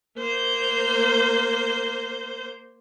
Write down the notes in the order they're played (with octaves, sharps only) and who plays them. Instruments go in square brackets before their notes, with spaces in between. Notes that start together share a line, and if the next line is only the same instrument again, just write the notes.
[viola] A#3 C5